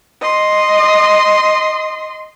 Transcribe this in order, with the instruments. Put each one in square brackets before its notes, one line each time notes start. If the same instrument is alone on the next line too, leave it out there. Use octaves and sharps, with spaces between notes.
[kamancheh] D#5 C6